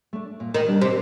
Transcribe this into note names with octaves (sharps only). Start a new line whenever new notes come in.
A3 D4
A#2
D#3
G3 D4
C3